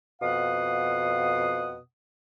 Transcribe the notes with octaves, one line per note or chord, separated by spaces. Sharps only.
F2 B2 F5 F#5 D#6